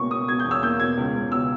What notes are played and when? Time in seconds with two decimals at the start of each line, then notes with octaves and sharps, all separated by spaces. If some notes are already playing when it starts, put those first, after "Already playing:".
Already playing: C#2 B2 A#3 C#6
0.11 B2 D#6
0.28 B2 G#6
0.40 G6
0.45 E2
0.51 E6
0.63 A#3 G6
0.80 B2 G#6
0.97 C#2
1.14 C#2
1.31 B2 E6